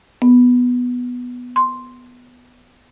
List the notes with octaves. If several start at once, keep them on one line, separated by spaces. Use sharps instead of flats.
B3
C6